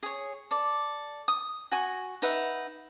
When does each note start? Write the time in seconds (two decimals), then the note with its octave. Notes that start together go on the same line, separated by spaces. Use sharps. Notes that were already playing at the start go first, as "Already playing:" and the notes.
0.03 G#4 C#5
0.51 A4 D5
1.28 D#6
1.72 F#4 G#5 C#6
2.22 D#4 B4 E5 F#5